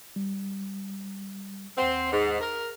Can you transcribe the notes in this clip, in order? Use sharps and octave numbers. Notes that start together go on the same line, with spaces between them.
G3
D#2 C4 F#5
G#2
A#4